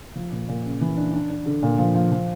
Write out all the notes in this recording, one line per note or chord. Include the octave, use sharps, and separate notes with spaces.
F3
A#2
A#2
C#3
E3
D4
D4
D4
D3
A#2
F3
F3
F3